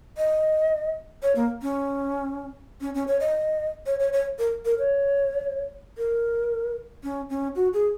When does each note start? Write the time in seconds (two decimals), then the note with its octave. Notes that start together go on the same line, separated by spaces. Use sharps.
0.17 D#5
1.23 C#5
1.36 A#3
1.62 C#4
2.81 C#4
2.95 C#4
3.07 C#5
3.20 D#5
3.86 C#5
4.00 C#5
4.13 C#5
4.39 A#4
4.65 A#4
4.79 C#5
5.98 A#4
7.03 C#4
7.30 C#4
7.56 F#4
7.74 G#4